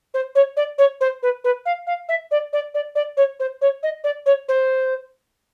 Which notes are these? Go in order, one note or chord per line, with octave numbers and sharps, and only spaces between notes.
C5
C#5
D5
C#5
C5
B4
B4
F5
F5
E5
D5
D5
D5
D5
C#5
C5
C#5
D#5
D5
C#5
C5